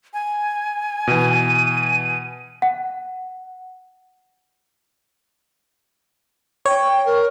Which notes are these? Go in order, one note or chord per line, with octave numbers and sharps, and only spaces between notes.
G#5
B2 E3 D#7
F#5
C#5 G5
A#4